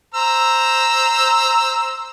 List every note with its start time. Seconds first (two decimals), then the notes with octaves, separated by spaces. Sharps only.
0.14 C5 A#5 E6